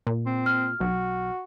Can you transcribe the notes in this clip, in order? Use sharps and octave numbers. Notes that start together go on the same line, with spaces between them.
A#2
C4
F6
B1 F#4